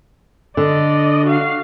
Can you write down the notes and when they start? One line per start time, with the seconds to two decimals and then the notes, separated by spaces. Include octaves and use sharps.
0.57 D3 D5 D#5
1.25 F#4 F5